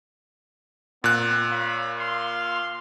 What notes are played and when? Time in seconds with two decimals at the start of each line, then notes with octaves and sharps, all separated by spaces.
1.04 A#2 B3 C4 F#6
1.51 C#5 F5 B5
1.97 F5 C6